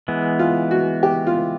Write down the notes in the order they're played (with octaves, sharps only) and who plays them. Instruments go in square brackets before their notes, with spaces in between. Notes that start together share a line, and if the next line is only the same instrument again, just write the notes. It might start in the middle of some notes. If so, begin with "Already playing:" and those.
[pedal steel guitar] E3 G#3 B3
[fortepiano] F4
F#4
G4
F4